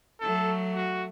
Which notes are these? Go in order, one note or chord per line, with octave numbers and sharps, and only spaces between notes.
F#3 A3 A4
F#4